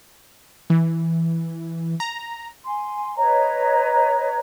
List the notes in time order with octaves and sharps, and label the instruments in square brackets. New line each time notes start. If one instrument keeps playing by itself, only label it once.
[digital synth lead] E3
A#5
[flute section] G#5 C6
B4 C#5 D#5 A#5